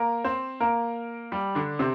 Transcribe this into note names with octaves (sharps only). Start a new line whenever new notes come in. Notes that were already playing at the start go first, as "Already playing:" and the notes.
Already playing: A#3 A#4
C4 C5
A#3 A#4
G3 G4
D3 D4
C3 C4